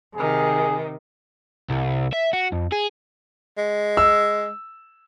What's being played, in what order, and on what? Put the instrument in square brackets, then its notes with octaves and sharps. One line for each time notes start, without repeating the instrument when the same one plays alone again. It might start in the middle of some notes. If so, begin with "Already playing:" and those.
[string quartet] C3 D#3 [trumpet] G#4
[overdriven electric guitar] C2
E5
F#4
F2
G#4
[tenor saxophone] G#3
[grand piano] E6